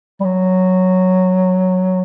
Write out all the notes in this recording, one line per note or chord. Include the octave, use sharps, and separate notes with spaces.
G3
F#3